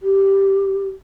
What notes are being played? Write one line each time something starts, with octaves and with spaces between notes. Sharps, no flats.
G4